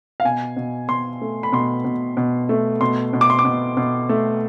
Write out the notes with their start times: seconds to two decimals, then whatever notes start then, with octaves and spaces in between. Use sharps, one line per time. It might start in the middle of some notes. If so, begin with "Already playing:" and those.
0.20 F5
0.25 B2 G#5
0.57 B2
0.88 B2 C6
1.21 A3
1.43 B5
1.52 B2 C6
1.84 B2
2.17 B2
2.49 A3
2.81 B2 C6
3.13 B2
3.21 D6
3.30 C6
3.39 D6
3.45 B2
3.77 B2
4.09 A3